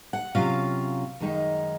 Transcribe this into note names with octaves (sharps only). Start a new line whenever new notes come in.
F#5
C3 F#3 C#4 F4 F5
F#2 D#3 G#3 D#4